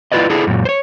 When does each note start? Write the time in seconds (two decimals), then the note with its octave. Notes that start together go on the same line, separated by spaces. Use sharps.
0.12 E4 F4 G4 B4 D5 D#5
0.30 D4 E4 G#4 A4
0.47 F#2 A#2
0.65 C5 C#5